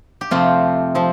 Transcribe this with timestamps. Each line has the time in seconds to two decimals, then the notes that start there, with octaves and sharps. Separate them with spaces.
0.21 G4
0.31 F2 C3 A3 C4 F4
0.95 F3 C4